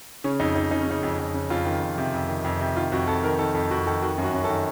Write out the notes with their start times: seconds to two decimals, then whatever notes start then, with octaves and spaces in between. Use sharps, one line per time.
0.24 C#3 C#4
0.40 F2 D#4
0.55 F2 D#4
0.71 C#3 D#4
0.81 C#4
0.88 C#3 D#4
1.03 F2
1.19 F2
1.34 C#3
1.50 F2 F4
1.65 D#3
1.81 F2
1.98 C3
2.14 F2
2.29 D#3
2.44 F2
2.60 C3
2.76 D#3 F4
2.92 F2 F#4
3.07 F2 A4
3.23 D#3 A#4
3.39 D#3 A4
3.55 F2 A4
3.71 F2 F#4
3.86 D#3 A4
4.02 D#3 F#4
4.18 F#2
4.23 F#4
4.34 F#2
4.44 A4
4.49 D#3